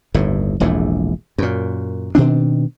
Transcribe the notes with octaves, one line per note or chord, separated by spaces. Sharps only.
G1 D#2 A2
E1 A#1 E2 A2
F#2 A#2
B2 D#3 C4 D4